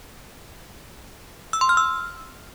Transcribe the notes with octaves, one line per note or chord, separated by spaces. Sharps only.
E6
C6
F6
E6